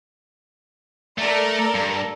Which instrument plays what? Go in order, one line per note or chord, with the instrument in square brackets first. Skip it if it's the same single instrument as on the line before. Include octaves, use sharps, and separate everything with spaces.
[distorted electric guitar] A3 [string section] A4 A#4 D5
[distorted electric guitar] G2